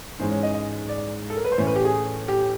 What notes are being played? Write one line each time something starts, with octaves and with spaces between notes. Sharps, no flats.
G#2 E3 G#3 C#4 C5
C#5
D#5
D#5
D5
A4
A#4
B4
C5
A2 E3 A3 C#4 C#5
B4
G4
G#4
G4